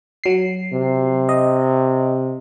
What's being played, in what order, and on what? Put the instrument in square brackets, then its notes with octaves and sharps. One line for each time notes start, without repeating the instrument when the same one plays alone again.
[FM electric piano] F#3 C7
[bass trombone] C3
[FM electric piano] D#5